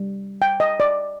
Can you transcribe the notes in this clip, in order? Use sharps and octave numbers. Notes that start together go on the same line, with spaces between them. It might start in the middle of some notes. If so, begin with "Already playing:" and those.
Already playing: G3
G5
D#5
D5